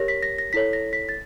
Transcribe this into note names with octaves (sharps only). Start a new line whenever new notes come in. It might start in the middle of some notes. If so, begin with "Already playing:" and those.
Already playing: G4 A#4 C#5 A#6
B6
A#6
A#6
E4 A4 C#5 B6
A#6
B6
A6